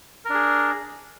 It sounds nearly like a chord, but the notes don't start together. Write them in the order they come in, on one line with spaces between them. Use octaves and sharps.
A#4 D4 G#4